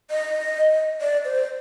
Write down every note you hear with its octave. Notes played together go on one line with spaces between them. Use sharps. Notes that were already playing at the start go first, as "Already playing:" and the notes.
D#5
D5
C5